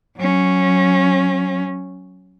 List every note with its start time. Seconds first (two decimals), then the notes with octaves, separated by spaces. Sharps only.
0.17 F#3 C#4